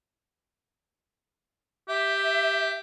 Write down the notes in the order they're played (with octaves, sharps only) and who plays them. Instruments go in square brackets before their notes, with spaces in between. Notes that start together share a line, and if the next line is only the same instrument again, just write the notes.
[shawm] G4 [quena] E5